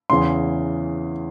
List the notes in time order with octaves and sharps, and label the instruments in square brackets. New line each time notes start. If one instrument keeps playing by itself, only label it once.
[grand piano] E2 C#3 E3 C6